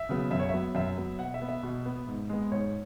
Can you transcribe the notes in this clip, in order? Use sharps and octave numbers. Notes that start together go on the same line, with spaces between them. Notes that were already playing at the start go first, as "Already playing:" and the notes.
Already playing: E5
C#3 F#3 B3
F#2 E5
C#5
F#3 B3 E5
F#2 E5
F#3 B3
B2 F#5
E5
B3
E5
B2
B3
G#2
G#3 B3
G#2 C#5